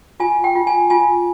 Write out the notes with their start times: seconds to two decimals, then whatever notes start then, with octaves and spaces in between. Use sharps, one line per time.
0.20 F4 G#5
0.44 G5
0.55 F4
0.67 G#5
0.90 F4 G#5